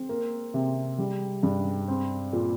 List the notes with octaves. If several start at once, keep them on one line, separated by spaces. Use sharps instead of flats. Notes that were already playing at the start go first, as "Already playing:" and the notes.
Already playing: C4
A#3
C3
G3
G2
C4
A#2